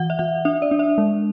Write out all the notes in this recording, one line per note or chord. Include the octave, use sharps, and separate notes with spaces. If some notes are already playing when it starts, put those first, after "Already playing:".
Already playing: E3 F#5
E5
E3 F#5
D4 E5
D5
D4
E5
G#3